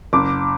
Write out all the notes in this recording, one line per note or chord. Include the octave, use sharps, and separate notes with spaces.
F#1 D6